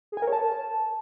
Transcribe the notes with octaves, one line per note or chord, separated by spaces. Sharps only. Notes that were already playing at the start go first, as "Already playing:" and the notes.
G#4
G#5
A#4
C#5
A5